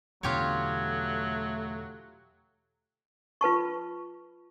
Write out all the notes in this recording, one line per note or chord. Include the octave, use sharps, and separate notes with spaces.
E2 B2 D3 F#3 A3 F4 G4 C#5
F4 B4 A5 C#6